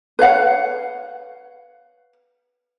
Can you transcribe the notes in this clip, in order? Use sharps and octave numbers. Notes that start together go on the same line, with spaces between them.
B4 C#5 F5 F#5